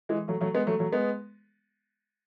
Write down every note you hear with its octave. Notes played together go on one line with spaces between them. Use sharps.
E3 G#3
F#3 A3
F#3 A3
G#3 B3
F#3 A3
F#3 A3
G#3 B3